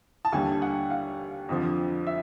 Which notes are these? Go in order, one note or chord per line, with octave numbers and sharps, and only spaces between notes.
A5
D#2 D3 G3 G#5
F#5
F5
F2 D3 F3
E5